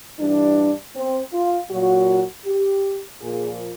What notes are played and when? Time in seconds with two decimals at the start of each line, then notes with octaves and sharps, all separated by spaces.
0.19 G2 E3 G3 D4
0.95 C4
1.33 F4
1.71 A#2 F#3 F#4
2.46 G4
3.21 A#2 F3 G#4